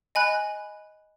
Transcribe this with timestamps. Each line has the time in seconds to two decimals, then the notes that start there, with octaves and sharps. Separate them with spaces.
0.15 D#5 G#5 B5 F#6